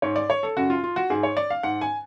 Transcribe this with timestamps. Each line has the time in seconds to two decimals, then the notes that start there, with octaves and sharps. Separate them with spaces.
0.02 G#2 C#5
0.16 D5
0.30 C#5
0.43 A4
0.56 F#2 C#3 F#4
0.70 F4
0.84 F4
0.96 F#4
1.10 G#2 G#4
1.23 C#5
1.37 D5
1.50 F5
1.63 G#2 F#5
1.81 G#5